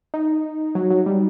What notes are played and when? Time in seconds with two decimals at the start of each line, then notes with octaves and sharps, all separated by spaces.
0.14 D#4
0.75 F#3
0.91 F#3
1.06 G3